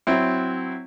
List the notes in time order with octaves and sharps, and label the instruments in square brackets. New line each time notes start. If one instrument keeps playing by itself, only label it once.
[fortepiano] F#3 C4 E4